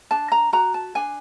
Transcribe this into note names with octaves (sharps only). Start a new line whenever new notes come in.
D4 A5
A#5
F#4 A#5
A5
D4 G#5